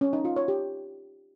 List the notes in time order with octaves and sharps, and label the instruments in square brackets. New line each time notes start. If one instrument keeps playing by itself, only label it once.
[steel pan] C#4
D#4
F4
C#5
G4